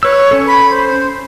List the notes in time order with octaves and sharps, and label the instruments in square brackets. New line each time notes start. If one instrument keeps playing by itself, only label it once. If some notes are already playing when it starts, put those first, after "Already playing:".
[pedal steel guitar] B4 E6 [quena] C#5
[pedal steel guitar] C#4 A4
[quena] B5
C5